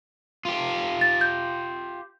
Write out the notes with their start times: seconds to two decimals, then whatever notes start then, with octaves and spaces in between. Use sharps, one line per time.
0.45 F4 G4
1.01 A6
1.21 G6